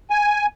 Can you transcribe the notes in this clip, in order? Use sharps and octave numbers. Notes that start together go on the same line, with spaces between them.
G#5